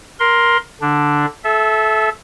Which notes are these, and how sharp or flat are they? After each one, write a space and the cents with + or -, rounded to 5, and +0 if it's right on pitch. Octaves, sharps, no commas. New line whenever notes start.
A#4 +10 C6 +0
D3 +0 D4 +0
A4 -25 E5 +0